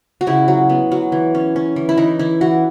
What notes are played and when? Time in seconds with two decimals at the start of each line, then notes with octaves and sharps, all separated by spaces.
0.21 F#4
0.27 C#3 E4
0.48 F#3
0.69 B3
0.92 F#3
1.12 E3
1.35 C#4
1.56 C#4
1.76 E3
1.89 E4
1.98 E3 D#4
2.19 E3 E4
2.41 E3 F#4